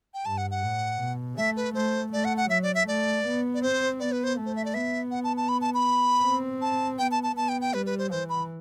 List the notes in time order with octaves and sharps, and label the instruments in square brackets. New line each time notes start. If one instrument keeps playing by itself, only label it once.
[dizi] G5
[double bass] G2 [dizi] A5
[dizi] F#5
F#5
[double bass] A2
B2
[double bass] A3 [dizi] E5
[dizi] B4
[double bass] A3 [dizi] C5
[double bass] A3 [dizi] D5
[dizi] F#5
F#5
[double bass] F#3 [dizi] E5
[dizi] D5
E5
[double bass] A3 [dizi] D5
[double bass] B3
[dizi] D5
[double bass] C4 [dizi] C5
[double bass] B3 [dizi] D5
[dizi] B4
C5
[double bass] A3
[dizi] C5
E5
D5
[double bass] B3 [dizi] E5
[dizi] F#5
A5
A5
B5
A5
B5
[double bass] C4
[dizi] A5
[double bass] B3 [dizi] G5
[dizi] A5
A5
[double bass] B3 [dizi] A5
[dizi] G5
G5
[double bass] G3 [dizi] B4
[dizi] B4
C5
[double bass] E3 [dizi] C5
[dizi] B5